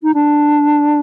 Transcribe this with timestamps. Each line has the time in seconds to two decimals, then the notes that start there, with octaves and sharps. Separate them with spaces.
0.02 D#4
0.13 D4